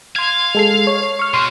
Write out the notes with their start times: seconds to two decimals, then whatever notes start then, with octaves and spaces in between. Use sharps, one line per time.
0.16 F5 C6 G#6
0.55 G#3 A4 C7
0.87 C#5
1.19 C#6 F6
1.34 B2 F#4 C6